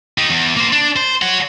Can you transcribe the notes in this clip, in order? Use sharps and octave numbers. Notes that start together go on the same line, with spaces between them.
D#4 G4
E2
A#3 C5
D4
C5
C#5 F#5